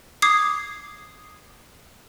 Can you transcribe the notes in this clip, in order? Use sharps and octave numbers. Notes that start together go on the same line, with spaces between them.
D6 D#6 G#6 C7